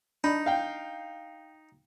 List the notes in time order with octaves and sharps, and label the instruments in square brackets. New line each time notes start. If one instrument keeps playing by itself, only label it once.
[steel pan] D4 [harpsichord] D#4 [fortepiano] B5
[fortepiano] F5 G5